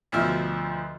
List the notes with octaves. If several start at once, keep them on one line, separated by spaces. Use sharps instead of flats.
D2 B2 F3 E5 F6